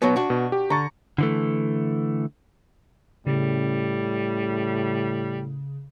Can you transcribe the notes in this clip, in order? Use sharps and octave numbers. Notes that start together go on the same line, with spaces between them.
B2 F#3 B3
D4 F#4
B2
G4
D3 A#5 C#6 A6
D3 E3 A3
A2 C#3 G3